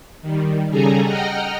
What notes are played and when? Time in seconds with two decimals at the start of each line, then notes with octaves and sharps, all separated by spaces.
0.22 D#3 G3
0.70 C#3 G3 G#4 A4 G#5 A#5
1.04 D#5 F#5 G5 A#5 F6